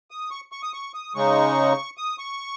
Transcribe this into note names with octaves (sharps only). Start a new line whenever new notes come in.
D#6
C#6
C#6
D#6
C#6
D#6
C#3 G#3 D#4 C#6
D#6
C#6